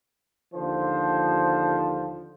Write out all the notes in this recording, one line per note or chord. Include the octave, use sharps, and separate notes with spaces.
D#2 D3 F3 C5